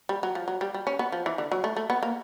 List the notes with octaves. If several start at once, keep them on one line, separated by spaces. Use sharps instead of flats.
G3
F#3
F3
F#3
G3
G3
C#4
B3
F3
E3
D3
F#3
A3
A3
B3
A#3